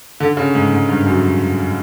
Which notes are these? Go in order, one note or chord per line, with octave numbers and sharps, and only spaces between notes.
D3
C#3
G#2
G#2
G2
F#2